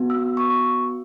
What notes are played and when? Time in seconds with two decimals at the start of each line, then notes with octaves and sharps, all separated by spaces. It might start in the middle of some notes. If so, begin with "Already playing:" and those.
Already playing: B3 F#4
0.10 E6
0.37 C#6